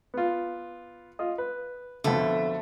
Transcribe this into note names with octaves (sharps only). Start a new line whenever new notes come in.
B3 F4
F4 D#5
B4
F2 B2 D3 A3